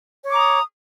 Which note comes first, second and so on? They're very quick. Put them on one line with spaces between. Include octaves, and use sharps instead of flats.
C#5 D6 A#5 D#6